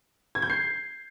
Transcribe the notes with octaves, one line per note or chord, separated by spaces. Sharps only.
G#6
G6
C7